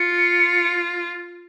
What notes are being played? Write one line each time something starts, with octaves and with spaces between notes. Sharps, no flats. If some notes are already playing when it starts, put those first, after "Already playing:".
Already playing: F4 C#7